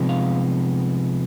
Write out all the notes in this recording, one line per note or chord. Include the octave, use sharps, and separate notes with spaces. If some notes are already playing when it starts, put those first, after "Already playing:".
Already playing: C3 F3 G#3 B3
F5